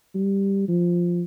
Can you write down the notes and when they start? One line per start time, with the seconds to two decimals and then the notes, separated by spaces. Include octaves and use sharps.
0.15 G3
0.68 F3